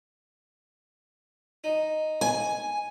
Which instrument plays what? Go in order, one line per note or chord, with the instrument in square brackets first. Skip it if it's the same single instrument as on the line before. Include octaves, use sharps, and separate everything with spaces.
[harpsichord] D#4
[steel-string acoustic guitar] G#5